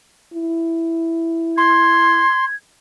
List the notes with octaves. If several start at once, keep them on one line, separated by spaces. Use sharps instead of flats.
E4
C6 G#6